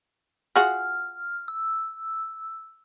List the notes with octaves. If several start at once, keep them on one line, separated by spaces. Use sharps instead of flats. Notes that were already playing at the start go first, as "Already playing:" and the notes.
F4 F#4 G#4 F6
E6